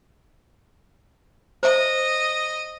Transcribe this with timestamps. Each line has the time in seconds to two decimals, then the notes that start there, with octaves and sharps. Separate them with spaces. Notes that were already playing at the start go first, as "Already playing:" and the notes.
1.63 C5 D#5 E5